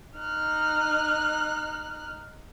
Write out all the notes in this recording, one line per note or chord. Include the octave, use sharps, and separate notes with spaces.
D#4 F6 F#6